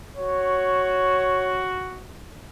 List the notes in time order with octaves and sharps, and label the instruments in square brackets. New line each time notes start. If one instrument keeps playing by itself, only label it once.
[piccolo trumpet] F#4 [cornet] C#5